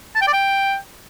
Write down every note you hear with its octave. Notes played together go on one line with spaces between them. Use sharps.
A5
G5
D5
G5